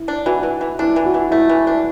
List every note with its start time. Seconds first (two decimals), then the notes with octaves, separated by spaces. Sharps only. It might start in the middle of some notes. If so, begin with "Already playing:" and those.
Already playing: E4
0.08 D4
0.26 E3 F#4
0.43 E3
0.61 E3
0.79 D4 E4
0.96 E3
1.05 F#4
1.14 E3
1.31 A3 E4
1.49 E3
1.67 D4